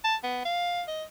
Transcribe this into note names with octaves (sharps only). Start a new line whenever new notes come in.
A5
B3
F5
D#5